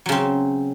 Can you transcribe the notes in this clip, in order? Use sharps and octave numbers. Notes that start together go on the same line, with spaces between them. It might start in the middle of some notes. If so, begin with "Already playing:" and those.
C#3 F#3 C4